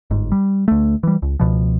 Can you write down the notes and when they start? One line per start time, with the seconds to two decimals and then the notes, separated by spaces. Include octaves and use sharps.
0.11 G1 G#2
0.32 G3
0.68 D2 A3
1.03 E3 G3
1.22 C#2
1.40 C#2 B2 F3